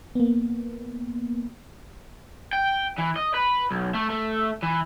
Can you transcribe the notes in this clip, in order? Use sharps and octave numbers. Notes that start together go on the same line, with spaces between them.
A#3 B3
G5
E3
D#5
B4
B1
A3
A3
E3